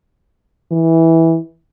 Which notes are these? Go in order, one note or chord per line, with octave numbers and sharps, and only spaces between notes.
E3